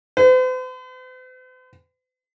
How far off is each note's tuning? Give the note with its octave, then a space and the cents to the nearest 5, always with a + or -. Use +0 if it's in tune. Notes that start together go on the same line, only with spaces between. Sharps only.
C5 -45